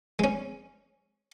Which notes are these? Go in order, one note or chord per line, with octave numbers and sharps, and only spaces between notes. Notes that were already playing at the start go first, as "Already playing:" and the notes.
G#3 C#4